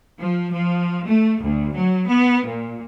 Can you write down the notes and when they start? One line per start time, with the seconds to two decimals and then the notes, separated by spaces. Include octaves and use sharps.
0.21 F3
0.52 F3
1.07 A3
1.41 D2
1.75 F#3
2.09 B3
2.46 A#2